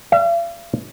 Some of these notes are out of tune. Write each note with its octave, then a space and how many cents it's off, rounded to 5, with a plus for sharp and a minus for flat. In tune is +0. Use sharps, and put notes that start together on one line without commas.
D5 -10 F5 -45